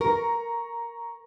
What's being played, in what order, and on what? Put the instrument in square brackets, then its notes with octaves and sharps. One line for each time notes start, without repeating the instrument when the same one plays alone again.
[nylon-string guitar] A#4 [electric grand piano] A#5 C#6